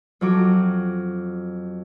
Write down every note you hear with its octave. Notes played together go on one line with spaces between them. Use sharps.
F2 F#3 D6